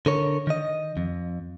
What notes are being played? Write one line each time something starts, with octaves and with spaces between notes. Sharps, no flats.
D3 A#4 C#5
D#3 D#5
F2